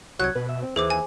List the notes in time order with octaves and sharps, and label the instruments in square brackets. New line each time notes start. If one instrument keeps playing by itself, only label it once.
[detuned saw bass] C2 [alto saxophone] F#3 [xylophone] F#6 G#6
[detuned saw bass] B2 [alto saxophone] B4
[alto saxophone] E5
C4
[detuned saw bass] D#2 [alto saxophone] E3 [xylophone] G#4 C5 D6
[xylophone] G#5